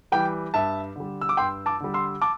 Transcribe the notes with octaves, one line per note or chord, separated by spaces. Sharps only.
E3 G3 G5
G2 E5 A5
D3 G3
E6
D6
G2 G5 C6
A5 D6
D3 G3
C6 E6
A5 D6